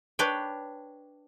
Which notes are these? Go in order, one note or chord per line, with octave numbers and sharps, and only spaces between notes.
D4 B4 C#5 G5